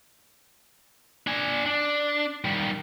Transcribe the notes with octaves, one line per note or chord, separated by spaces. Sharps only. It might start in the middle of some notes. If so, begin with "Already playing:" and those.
D4 G#5
D4
D#3 G3